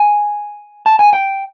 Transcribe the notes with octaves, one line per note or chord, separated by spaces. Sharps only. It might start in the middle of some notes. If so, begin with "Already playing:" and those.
Already playing: G#5
A5
G#5
G5